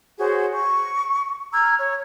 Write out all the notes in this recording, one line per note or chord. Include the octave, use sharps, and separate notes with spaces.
F#4 G#4 C5 C#5
C#6
A#5 E6 F6 G#6
C#5